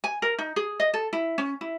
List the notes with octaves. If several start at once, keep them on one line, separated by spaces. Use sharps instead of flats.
G#5
A#4
D#4
G#4
D#5
A4
E4
C#4
E4